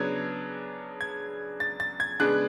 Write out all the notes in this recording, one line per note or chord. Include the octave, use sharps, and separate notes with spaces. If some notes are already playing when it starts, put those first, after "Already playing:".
Already playing: C#3 F#3 B3 D4 G#6
G#6
A6
A6
G#6
C#3 G#3 B3 D4 F#6